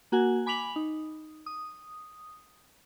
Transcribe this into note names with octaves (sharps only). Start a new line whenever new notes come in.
A#3 F#4 F#5 G#5
G#5 B5 D6 B6 F7 F#7
D#4
D#6